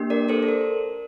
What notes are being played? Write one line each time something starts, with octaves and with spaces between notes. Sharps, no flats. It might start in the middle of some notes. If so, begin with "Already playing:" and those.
Already playing: A#3 D4 G4
A#4 D5
A4 C5
A4
A#4